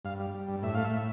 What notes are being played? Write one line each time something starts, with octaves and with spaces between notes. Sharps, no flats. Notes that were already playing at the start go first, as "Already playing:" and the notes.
G2 F5
G3
G3
G2
A2 E5
A3 F5
E5
A2